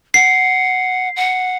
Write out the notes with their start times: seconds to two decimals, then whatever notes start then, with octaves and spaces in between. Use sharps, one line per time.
0.14 F#5 C7
1.16 F#5